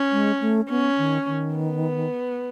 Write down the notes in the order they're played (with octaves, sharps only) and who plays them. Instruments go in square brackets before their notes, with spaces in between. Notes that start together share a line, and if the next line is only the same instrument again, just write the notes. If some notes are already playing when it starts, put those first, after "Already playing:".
Already playing: [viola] C#4
[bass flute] G#3
A3
[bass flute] B3 [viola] C#4
[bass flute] D#3
D#3
[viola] B3